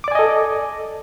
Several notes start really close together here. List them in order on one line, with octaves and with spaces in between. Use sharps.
D6 D5 G#5 D#5 A4